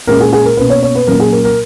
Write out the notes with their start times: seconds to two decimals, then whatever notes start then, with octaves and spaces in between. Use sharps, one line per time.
0.07 A#2 G#3 C#4 A#4
0.21 G#4
0.33 G#4
0.45 A#4
0.57 B2 A#3 C#4 B4
0.70 C#5
0.83 C#5
0.95 B4
1.07 A#2 F#3 A#3 C#4 A#4
1.20 G#4
1.32 A#4
1.45 A#4